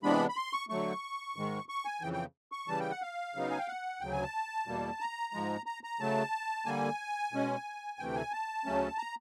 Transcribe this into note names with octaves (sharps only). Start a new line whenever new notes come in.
C3 E3 G#3 B3 D4 B5
B5
C6
C#6
D3 F#3 A3 C#6
G#2 D#3 G#3
C#6
G#5
F2 C#3 E3 G5
G5
C#6
C#3 E3 G3 A5
G5
F#5
F5
C#3 F#3 B3 D#4
G#5
G5
F#5
D2 C#3 F#3 G5
G#5
A5
E2 B2 G3 A#3
A#5
G#2 F3 G#3
A#5
A#5
C#3 F#3 A3 A5
D3 G3 A#3 G#5
B2 G#3 C#4
D2 C3 E3 A3 G5
G#5
A5
D2 C#3 F#3 A3 C#4
A#5